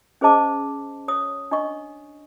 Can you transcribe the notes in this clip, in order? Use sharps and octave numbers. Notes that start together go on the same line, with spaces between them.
C#4 G#4 C5 D#5 A5 D6
C#5 D#6
D4 D#5 C#6